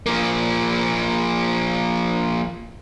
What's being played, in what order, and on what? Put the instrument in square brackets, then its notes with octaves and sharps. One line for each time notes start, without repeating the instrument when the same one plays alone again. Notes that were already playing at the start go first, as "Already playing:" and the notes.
[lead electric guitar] F3 A#3